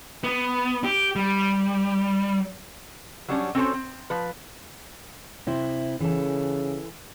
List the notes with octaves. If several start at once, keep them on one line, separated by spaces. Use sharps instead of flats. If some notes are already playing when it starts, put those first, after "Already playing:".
B3
G4
G3
F#3 G3 C#4 D4
C4 C#4 F#4 A4 C5 C#5
C4
F3 B4
C3 E4 C5
C#3 E3 A4